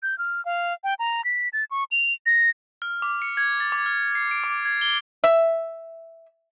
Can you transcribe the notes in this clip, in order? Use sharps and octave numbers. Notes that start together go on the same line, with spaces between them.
G6
F6
F5
G5
A#5
B6
A6
C#6
F7
A#6
F6
D6
C#7
G#6
A6
D6
F6
C7
D7
D6
G#6
G7
E5